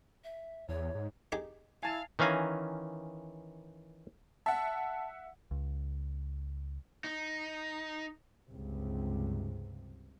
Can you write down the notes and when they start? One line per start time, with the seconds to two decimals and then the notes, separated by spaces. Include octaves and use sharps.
0.24 E5
0.69 E2 C#5
0.95 G#2
1.32 D#4 G4 G#4
1.83 E4 F5 G#5 A5
2.19 D#3 E3 C#4 F5 G#5 A#5
4.46 E5 F#5 A5
5.51 C#2
7.04 D#4
8.48 C#2 G2 C3